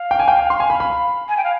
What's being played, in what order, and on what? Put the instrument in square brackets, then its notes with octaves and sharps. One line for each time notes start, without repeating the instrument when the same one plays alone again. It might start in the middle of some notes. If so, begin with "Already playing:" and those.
Already playing: [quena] F5
[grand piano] G5
G#5
G5
C6
G#5
B5
B5
[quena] G#5
G5
F5